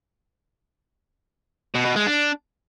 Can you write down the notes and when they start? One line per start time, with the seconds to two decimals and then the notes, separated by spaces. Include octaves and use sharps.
1.75 B2
1.85 B2
1.96 G#3
2.06 D4